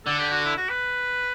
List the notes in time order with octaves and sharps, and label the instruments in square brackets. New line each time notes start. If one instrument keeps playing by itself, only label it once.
[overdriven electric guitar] D3 [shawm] A4
[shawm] G4
F#4
E4
F#4
B4